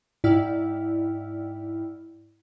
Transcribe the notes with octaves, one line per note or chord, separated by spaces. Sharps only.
G#2 E4 D5 G5 E6 F6